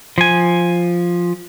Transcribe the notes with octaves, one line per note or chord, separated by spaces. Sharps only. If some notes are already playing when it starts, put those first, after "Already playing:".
F3 G#5